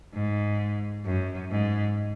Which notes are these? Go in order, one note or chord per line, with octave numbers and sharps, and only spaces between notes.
G#2
F#2
G#2